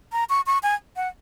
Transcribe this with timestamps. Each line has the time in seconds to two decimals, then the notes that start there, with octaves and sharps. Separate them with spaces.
0.12 A#5
0.29 C#6
0.47 C#6
0.63 G#5
0.96 F#5